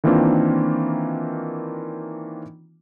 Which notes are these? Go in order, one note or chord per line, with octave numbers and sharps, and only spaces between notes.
D#3 E3 A#3 C4 D4 F4